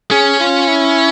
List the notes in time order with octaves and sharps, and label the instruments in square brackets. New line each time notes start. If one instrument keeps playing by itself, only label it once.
[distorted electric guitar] C#4 [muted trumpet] G#4
[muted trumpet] F4
E4